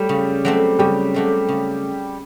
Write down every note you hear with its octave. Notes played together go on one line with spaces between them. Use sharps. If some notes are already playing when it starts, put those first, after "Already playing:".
Already playing: F#3 G3 A3 G4
C#3
F#3 A3 C4
C#3 G3 G4
F#3 A3 C4
C#3